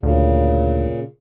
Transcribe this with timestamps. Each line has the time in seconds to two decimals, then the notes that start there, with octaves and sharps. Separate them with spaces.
0.03 D2 A#2 C#3